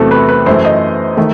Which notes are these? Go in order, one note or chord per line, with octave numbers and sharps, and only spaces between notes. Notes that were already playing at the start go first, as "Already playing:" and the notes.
Already playing: E2 C3 F#3 A3 C4 A4
B4
B4
F#2 E3 A3 C5
D#5
D#3 A3